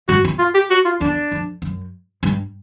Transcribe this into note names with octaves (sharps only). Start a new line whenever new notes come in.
G2 F#4
E2
F4
G4
F#4
F4
E2 D4
F2
F#2
G2